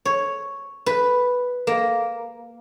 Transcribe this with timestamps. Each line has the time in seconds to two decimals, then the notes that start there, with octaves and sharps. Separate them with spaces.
0.05 C#5
0.86 B4
1.67 A#3